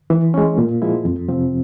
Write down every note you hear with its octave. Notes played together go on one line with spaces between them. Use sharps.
E3
G#3 C#4
A#2
F3 G#3 E4
F2
C3 F3 C4